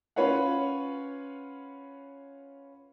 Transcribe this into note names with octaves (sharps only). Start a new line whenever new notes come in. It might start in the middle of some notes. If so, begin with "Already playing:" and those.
C#4 F4 B4 C#5 F5 F#5